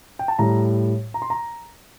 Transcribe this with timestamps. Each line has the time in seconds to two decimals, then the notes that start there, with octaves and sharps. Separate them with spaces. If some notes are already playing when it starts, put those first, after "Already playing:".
0.19 G5
0.28 A5
0.39 A2 G3 A#5
1.14 A#5
1.22 C6
1.30 A#5